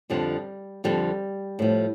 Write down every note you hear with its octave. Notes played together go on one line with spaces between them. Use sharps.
F2 D3 F3 G3
F2 D3 F3 G3
A2 F3